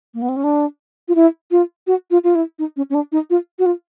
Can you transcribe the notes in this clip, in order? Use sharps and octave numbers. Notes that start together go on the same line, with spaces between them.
A#3
B3
C4
C#4
D4
F4
E4
F4
F#4
F4
F4
E4
D#4
C#4
C#4
D4
D#4
F4
F#4
F4